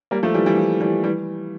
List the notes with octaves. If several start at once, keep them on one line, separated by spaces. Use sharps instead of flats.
G3 A#3
F3 A3
E3 G3
E3 G3
F3
E3 G3
E3 G3